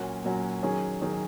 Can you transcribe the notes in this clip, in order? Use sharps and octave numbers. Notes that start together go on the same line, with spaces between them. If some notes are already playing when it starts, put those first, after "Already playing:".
Already playing: A#2 F#3 C#4 F#4
A#2 F#3 C#4 F#4
D#3 F#3 C#4 G#4
D#3 F#3 C#4 G#4